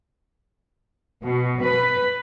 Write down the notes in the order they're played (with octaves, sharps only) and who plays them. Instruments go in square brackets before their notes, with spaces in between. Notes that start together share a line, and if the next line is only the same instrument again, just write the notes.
[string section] B2
B4